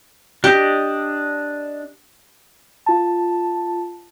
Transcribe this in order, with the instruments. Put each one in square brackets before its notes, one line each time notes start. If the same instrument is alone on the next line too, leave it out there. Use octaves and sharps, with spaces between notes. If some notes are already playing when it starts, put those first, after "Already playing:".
[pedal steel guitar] D4 D#5 [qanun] G4
[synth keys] F4 A5